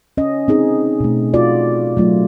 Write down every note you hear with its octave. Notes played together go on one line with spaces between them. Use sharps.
C#4 D#5
C4 D#4 G#4
B2 A3
F4 F#4 D5
F#3 A3 F4